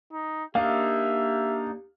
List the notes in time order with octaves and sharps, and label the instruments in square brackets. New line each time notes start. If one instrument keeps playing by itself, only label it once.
[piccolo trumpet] D#4
[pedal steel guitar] A#3 D4 D#4 [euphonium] G4 [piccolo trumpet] E5 [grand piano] F5